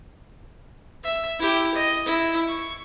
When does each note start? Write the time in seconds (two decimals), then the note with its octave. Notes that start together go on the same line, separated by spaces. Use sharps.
1.04 E5
1.39 E4 G4
1.74 D#5
2.06 E4
2.48 C#6